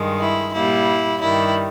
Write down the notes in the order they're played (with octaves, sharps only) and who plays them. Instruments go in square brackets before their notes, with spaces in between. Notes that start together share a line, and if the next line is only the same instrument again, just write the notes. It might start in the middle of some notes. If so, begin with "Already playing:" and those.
Already playing: [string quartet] G2 D#3 G#3
E4
A#2 G3 A#3 E4
G2 D#3 G3 E4